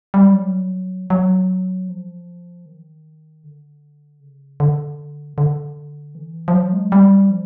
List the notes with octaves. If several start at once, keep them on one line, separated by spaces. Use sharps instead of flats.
G3
F#3
F#3
F3
D#3
D3
C#3
D3
D3
E3
F3
F#3
G#3
G3
F3